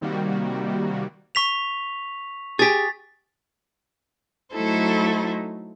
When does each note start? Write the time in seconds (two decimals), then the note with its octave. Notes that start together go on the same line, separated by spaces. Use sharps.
0.01 C3 D#3 G3 A#3 F#4
1.35 C#6 B6 F7
2.59 G4 G#4 A6 B6
4.53 F#3 A3 D#4 E4 A4 C5